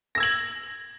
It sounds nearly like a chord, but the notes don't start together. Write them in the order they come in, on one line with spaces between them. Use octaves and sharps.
A#6 E6 G#6 F#7